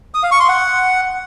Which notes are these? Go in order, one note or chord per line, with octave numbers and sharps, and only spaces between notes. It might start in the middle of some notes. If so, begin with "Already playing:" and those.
D#6
F5
C#6
C6
F#5